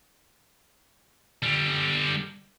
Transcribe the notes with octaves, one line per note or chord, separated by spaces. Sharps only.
D3 G3